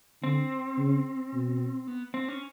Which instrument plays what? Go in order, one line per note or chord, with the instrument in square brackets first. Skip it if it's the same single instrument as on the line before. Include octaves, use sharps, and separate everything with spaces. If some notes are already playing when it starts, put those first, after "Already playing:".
[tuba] D3 [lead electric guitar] C4
[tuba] C#3
B2
[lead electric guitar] B3
C4
C#4